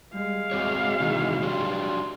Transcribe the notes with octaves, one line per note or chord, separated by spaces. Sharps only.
G3 G#3 F5
C4 F#4 C#5 D6
C3 D#3 E3 F#4
F#3 D4 G4 C6